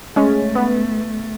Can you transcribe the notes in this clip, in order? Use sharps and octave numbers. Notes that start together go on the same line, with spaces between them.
G#3 A3 C#4
B3